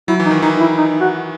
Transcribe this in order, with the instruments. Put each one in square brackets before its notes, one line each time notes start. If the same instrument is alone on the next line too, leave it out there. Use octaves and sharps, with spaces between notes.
[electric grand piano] F#3 [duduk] E4
[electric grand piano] E3
[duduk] D#4
[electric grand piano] D#3
[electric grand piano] E3 [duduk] D#4
[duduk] E4
D#4
F#4